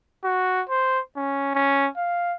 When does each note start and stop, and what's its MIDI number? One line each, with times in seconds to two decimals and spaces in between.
0.24 0.62 66
0.69 1.00 72
1.16 1.51 61
1.55 1.88 61
1.97 2.35 77